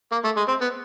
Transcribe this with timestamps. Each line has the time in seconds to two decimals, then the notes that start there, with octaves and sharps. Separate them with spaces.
0.12 A#3
0.24 A3
0.37 G#3
0.48 C4
0.61 B3